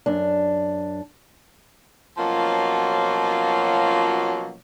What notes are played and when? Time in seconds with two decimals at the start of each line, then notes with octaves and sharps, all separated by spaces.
0.06 F#2 D4
2.18 B2 F3 F#3 A#3 C#4 F4